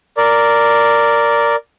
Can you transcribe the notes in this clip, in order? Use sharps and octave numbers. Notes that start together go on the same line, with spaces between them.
A#4 D5